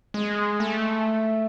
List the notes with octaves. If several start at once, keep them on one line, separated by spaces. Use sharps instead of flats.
G#3
A3